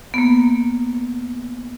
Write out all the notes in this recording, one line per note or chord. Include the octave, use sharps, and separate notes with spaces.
A#3 B3